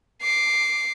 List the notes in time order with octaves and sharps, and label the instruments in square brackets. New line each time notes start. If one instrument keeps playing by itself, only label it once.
[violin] D6 C7